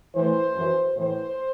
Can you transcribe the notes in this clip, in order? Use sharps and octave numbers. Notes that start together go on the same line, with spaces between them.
A2 E3 C5
F#2 E3
A2 E3 C5